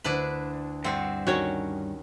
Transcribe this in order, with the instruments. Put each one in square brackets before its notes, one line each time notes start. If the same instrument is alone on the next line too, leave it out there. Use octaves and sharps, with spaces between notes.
[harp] D2 [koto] D4 E4 B4
[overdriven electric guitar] G2 [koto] C4 F#4 [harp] E5 C6
[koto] D#3 C#4 [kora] F#4 C#5